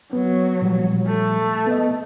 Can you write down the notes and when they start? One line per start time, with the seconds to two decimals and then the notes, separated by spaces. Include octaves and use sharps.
0.13 F#3 B3
0.61 A#2 F3 G3
1.07 A3
1.67 B3 A4 D#5